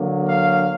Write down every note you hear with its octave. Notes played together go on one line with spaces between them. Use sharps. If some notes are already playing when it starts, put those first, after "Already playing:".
Already playing: D3 F#3 A#3
F5